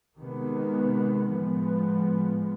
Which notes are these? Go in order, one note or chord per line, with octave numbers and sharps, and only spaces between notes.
C3 D#3 G#3 B3
A2 F3 G#3 B3